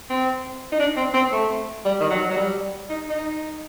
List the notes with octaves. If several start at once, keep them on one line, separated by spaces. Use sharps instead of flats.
C4
D#4
D4
C4
C4
A3
G3
D#3
F#3
F#3
G3
D#4
D#4